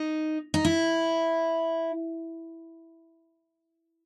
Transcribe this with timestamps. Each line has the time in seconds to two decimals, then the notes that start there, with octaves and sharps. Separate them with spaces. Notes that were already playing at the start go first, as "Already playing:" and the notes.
Already playing: D#4
0.54 D#4
0.65 E4